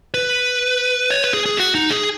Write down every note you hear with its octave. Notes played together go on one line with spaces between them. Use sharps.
B4
C#5
B4
G#4
G#4
F#4
D#4
G#4